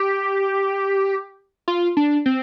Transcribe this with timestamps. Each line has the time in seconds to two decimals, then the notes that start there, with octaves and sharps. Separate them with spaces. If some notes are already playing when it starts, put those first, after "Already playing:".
Already playing: G4
1.68 F4
1.97 D4
2.26 C4